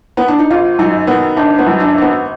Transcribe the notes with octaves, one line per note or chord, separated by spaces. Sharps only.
B3
D4
D#4
G#1 F4
F#2 D#4
D#3 B3
G#1 D4
B3
F#2
D4
G#1 D4
B3